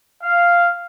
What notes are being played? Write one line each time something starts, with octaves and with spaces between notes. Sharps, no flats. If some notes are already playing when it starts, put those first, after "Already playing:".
F5